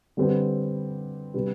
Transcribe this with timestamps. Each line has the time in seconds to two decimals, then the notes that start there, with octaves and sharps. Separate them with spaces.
0.17 D3 G3 C4 G4 B4
1.34 C3 G3 D4 G4 B4